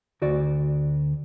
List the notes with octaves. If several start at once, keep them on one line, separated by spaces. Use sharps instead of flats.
D2 F#4 D5